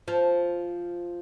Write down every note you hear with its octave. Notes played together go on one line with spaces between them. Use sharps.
F3